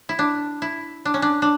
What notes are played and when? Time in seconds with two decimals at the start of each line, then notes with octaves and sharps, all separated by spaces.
0.09 E4
0.19 D4
0.62 E4
1.05 D4
1.14 C#4
1.22 D4
1.42 D4